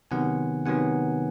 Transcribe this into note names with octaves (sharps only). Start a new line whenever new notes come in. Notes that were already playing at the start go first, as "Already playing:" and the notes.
C3 D#3 F#3 B3 F#5 G#5
C3 D#3 F#3 B3 F#5 G#5